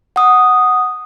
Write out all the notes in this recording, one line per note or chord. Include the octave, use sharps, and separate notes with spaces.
F#5 D#6